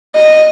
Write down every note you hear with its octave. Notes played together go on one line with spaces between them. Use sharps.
D#5